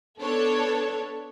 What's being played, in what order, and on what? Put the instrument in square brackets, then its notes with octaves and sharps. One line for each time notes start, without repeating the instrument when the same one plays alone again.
[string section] B3 D4 A4 C#5